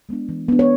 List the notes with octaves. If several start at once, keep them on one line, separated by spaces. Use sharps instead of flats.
G#3 B3 D4
E3
B3 D4
C#5